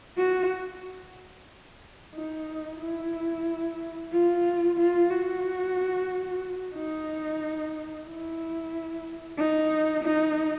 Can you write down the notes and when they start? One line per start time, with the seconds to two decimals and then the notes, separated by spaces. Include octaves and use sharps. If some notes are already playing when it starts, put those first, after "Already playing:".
0.17 F#4
2.14 D#4
2.80 E4
4.12 F4
4.78 F4
5.10 F#4
6.75 D#4
8.06 E4
9.38 D#4
10.03 D#4